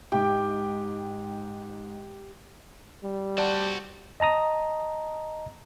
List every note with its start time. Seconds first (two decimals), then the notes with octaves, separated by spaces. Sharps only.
0.12 G#2 G4 G5
3.03 G3
3.38 F#4 C5 D5 F#5 A5
4.20 D#5 A5 A#5 D#6